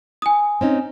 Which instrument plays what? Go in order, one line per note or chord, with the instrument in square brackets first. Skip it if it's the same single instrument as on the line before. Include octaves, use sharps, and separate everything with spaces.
[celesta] G#5 D#6
[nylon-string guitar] C4 C#4 D#4